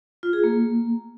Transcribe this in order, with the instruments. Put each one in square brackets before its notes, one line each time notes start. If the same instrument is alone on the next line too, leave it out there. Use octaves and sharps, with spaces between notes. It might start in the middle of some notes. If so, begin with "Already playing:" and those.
[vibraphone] F4
G#4
A#3